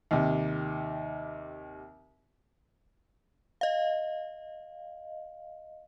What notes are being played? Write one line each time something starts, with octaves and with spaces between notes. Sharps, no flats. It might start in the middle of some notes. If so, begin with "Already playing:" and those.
D#2 C3
D#5 F5